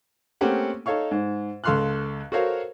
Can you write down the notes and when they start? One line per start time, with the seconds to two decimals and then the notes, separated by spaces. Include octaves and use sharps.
0.41 A3 A#3 C4 C#4 G4 F#5
0.86 D#4 A4 C#5 F5 C#6
1.11 G#2
1.64 C#2 A4 F5 C6 F6 F#6
2.32 F#4 A4 A#4 C5 C#5 F5